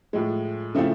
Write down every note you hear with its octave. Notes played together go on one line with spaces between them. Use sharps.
A2 F3 G#3
C#3 F3 A3 C4 E4